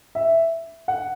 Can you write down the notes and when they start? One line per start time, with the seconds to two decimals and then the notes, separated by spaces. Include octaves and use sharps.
0.15 E5
0.88 F#5